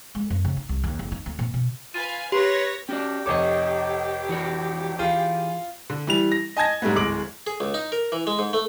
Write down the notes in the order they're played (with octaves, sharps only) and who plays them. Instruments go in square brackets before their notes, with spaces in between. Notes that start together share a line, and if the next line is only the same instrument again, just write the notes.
[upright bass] G#3
F#2
C#3
D#4
C2
D#2
F#1
D#4
D2
A#2
B2
[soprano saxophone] F4 [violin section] B4 F5 G#5 [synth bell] D#7
[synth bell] G4 [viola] B4 [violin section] C#5 A#6 [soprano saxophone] C6
[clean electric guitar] C#4 F#4 D5 [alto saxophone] G4
[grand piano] F1 C#5 D6 [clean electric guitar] A4 D#5
[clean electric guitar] E3 F#4 D5
[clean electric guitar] E3 G#4 [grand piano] F4
[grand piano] D3
E3 G3 F7
A#6
D#5 G#5 A5 G#6 A#6
G#2 G3 A3 B3
D1 G#3 D6 D7 F#7
[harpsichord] G#4
C#2
D#4
A#4
E3
G#3
G#2
A3